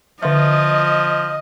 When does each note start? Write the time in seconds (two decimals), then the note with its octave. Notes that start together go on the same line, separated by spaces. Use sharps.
0.23 D3 F3 D#5 E5